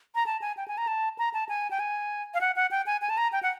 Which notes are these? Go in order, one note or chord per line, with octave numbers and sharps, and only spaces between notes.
A#5
A5
G#5
G5
G#5
A#5
A5
A#5
A5
G#5
G5
G#5
F5
F#5
F#5
G5
G#5
G#5
A5
A#5
G5
F#5